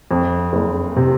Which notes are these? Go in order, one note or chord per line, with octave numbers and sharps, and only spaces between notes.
F2
F#1
C3